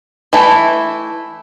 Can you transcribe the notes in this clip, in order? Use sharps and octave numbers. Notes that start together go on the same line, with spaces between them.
E3 A3 E4